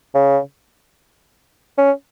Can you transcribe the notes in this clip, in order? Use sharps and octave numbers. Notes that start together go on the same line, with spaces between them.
C#3
C#4